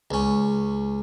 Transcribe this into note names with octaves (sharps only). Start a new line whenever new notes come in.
C#2 C#4